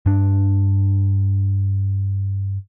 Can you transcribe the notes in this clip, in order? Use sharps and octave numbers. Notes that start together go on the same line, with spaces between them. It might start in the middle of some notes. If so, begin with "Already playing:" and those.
G2 D4